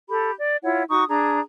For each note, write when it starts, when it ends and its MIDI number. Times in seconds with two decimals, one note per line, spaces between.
0.10 0.31 67
0.10 0.31 69
0.10 0.31 83
0.39 0.56 74
0.63 0.83 64
0.63 0.83 65
0.63 0.83 73
0.63 0.83 78
0.89 1.04 63
0.89 1.04 66
0.89 1.04 85
0.89 1.04 87
1.08 1.39 62
1.08 1.39 68
1.08 1.39 82